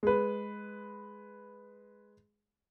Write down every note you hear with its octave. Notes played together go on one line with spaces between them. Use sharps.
G#3 B4